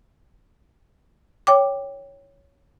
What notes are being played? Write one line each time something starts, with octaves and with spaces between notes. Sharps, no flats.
C#5 G5 D6